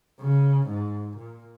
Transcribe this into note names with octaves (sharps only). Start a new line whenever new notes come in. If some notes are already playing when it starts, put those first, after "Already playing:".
C#3
G#2
A#2